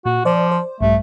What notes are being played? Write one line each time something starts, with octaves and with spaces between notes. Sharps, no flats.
A#2 F#4
F3 C5 D5 D6
C5
A#1 G2 G3 A3